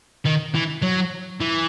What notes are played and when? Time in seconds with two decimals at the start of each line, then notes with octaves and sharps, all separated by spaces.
0.25 D#3
0.55 E3
0.82 F#3
1.40 E3